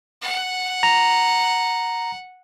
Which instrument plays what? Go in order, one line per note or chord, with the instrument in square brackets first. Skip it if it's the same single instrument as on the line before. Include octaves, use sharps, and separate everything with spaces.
[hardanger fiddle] F#5
[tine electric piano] A#5